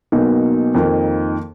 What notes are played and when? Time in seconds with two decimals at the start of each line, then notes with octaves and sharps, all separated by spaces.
0.12 B1 B2 A#3 D#4
0.75 F2 D#3 A#3 D#4